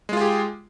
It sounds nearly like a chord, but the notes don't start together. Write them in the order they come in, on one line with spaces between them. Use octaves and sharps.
G#3 F4 G#4 G4